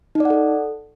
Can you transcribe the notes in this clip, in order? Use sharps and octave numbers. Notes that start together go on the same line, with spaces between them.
D#4 A4 D5 F#5